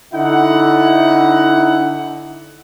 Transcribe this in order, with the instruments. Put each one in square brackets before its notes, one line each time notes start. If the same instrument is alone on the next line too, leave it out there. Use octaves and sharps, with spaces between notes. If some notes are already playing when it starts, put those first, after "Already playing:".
[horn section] D3 D#4 E4 F#5